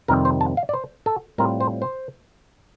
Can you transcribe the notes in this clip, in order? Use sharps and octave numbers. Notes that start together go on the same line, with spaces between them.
F2 C3 D#3 G3 C4 A#4
C5
A5
F5
D5
C5
A4
A2 G3 C4 F4 A#4
C5
C5